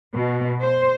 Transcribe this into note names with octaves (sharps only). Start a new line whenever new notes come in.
B2
C5